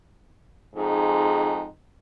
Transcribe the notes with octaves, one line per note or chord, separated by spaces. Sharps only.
F2 G#2 D#4 G#4